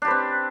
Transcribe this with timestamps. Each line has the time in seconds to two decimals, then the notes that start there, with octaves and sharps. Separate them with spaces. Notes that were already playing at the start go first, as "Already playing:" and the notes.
0.02 D4
0.05 G4
0.08 B4
0.11 C4